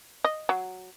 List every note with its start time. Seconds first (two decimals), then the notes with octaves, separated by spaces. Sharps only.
0.24 D#5
0.49 F#3